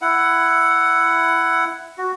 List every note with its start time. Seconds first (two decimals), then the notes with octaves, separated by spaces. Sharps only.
0.02 E4 F#5
1.98 F#4